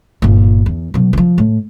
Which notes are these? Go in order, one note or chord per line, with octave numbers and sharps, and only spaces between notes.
G1 A#2
E2
B2 F#3
E3 F3
A2